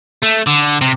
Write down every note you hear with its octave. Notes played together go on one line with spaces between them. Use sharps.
A3
D3
C3